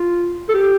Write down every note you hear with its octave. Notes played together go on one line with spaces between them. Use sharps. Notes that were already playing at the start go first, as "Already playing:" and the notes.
Already playing: F4
A4
G4